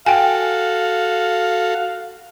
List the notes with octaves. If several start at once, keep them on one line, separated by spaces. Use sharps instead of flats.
F#4 A4 F5 G5 G#5